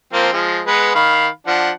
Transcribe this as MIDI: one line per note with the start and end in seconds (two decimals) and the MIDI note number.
0.13 0.31 53
0.13 0.31 58
0.13 0.31 60
0.33 0.62 53
0.33 0.62 56
0.67 0.91 56
0.67 0.91 59
0.67 0.91 71
0.95 1.28 51
0.95 1.28 77
0.95 1.28 83
1.47 1.71 53
1.47 1.71 62
1.47 1.71 78